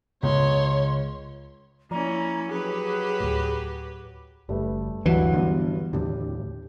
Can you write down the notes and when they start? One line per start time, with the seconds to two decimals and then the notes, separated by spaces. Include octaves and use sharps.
0.23 C#2 C#5 C6
1.91 F3 A#3 C#4 E4 D5 A#5
2.50 F#3 G4 G#4 B4
3.20 D2 A2
4.49 F#1 G3 A3 B4
5.06 D1 D2 G2 E3 F#3 F#5
5.33 D3 A#3 B3
5.93 D#2 A2 D3 G4